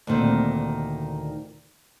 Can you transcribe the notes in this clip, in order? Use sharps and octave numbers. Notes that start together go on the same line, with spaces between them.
D2 A#2 D#3 C4